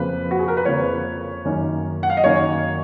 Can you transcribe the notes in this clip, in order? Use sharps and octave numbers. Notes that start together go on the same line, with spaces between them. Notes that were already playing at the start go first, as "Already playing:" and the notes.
Already playing: F2 C#3 F3 A#3 B4
F#4
G#4
A#4
B4
F2 C#3 F3 A#3 C#5
F#2 D#3 A#3 C#4
F#5
F5
D#5
F#2 D#3 A#3 C#4 C#5